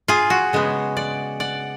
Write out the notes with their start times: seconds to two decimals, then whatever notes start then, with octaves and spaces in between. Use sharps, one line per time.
0.08 F4 G#4
0.30 F#4
0.53 C#3 G#3 B3
0.97 D5 F#5
1.40 D5 F#5